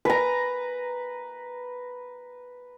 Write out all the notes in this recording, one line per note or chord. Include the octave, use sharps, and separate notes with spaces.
B4 A#5